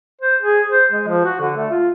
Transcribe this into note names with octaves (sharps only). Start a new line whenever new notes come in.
C5
G#4
C5
G#3
F3
F#4
D3
A3
F4